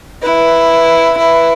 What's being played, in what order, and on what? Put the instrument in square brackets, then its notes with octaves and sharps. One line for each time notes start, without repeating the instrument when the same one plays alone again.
[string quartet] E4 [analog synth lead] B4
[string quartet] E4